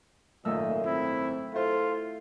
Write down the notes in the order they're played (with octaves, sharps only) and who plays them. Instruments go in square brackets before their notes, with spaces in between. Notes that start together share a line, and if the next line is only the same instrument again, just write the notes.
[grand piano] G#1 F#2 E6 [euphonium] A#2 [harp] A3 [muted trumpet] D#5
[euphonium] C4 [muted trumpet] E4
[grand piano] E4 C5 [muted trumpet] F4 [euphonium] A4